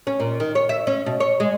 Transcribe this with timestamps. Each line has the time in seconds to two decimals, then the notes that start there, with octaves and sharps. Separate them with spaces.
0.07 C#4
0.20 A#2
0.40 D#3
0.55 C#5
0.69 E5
0.87 C#4
1.06 B2
1.20 C#5
1.40 G#3